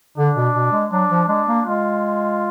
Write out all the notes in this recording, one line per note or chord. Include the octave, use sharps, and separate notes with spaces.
D3 D4
B2
B2
G#3
F#3 D4
F3
G#3 D4
A#3
G#3 F4